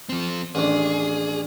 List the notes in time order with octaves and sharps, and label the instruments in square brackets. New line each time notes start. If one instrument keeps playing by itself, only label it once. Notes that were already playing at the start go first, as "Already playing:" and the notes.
[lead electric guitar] F3 C4
[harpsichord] A1 D#2 D4 [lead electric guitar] G#4